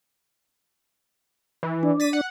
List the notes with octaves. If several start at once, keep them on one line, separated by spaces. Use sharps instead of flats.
E3
D4
A6 B6 D#7
F#5